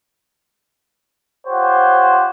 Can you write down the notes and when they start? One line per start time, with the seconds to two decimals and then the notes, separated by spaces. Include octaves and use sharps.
1.47 F4 G4 C5 C#5 F#5